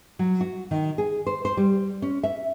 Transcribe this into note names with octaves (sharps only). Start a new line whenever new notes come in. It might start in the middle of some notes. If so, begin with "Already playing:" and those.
F#3
F#4
D#3
G#4
C5
C5
G3
C#4
E5